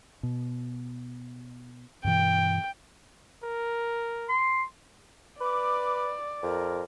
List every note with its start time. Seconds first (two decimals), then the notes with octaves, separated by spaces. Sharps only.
0.23 B2
2.04 G2 B2 E3 G5
3.44 A#4
4.29 C6
5.41 B4 D5 D6
6.43 F2 A#4